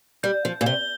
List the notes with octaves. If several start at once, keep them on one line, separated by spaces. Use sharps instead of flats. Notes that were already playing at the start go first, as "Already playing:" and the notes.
G3 G6
F3
A#2
C3 G7